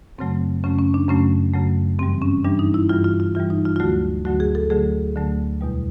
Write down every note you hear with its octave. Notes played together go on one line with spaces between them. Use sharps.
F#2 C#3 F#3 A3 C4
F#2 C#3 F#3 A3 C#4
C#4
D4
F#2 C#3 F#3 A3 C#4
F#2 C#3 F#3 A3
G2 E3 G3 C4
C#4
G2 E3 G3 D4
D#4
E4
G2 E3 G3 F4
F4
F4
G2 E3 G3 F4
D#4
F4
F4
D2 D3 F#3 A3 F#4
D2 D3 F#3 A3 F#4
G#4
A4
D2 D3 F#3 A3 G#4
D2 D3 F#3 A3
E2 B2 G3